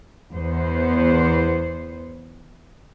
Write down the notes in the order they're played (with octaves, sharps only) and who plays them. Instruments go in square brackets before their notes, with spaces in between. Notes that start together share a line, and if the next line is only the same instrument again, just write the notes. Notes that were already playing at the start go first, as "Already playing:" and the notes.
[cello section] E2 B3 C5